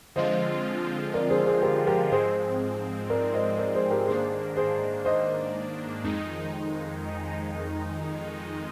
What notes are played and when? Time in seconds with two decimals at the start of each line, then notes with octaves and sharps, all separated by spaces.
0.16 D3 F3 G#3 C4 F4 C5 D#5
1.14 A#4 D5
1.30 G#4 C5
1.46 G#4 C5
1.62 G4 A#4
1.87 G4 A#4
2.11 G#2 F3 G#3 C4 G#4 C5
3.10 A#4 D5
3.34 C5 D#5
3.58 A#4 D5
3.74 G#4 C5
3.90 G4 A#4
4.07 G#2 D#3 A#3 D4 G#4 C5
4.57 G#4 C5
5.05 C5 D#5
6.04 F2 D#3 G#3 D#4